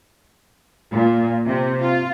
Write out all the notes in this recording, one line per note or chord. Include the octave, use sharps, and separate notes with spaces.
A#2
C3
F4